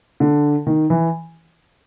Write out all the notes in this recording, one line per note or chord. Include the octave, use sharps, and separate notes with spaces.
D3
D#3
E3